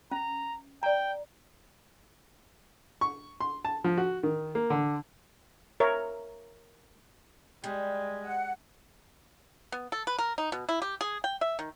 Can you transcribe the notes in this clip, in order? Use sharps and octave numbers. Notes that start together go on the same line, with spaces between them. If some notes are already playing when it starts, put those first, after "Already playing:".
C#4 A#5
D5 G5 A#5
C#6
C6
A5
F3
F#4
D#3
A#3
D3
A#4 C#5 E5
G3 G#3
F#5
B3
A4
B4
A#4
D#4
B2
E4
G4
G#4
G5
E5
D#3